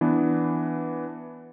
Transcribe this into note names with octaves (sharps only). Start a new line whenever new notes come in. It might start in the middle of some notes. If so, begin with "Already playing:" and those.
E3 B3 D4